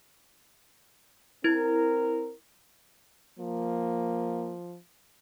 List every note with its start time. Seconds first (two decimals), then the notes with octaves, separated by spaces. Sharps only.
1.44 C4 E4 A#4 G#6
3.39 F3 A#3